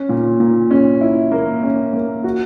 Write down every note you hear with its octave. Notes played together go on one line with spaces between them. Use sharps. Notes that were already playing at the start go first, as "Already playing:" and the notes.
Already playing: C#4
A#2
A#2
C#4
E4
A#3
C#4
A#3
F#4